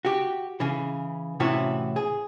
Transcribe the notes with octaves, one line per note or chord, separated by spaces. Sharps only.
F#4 G4
C#3 E3
A2 C3 E3 C#4 E4 F#4
G#4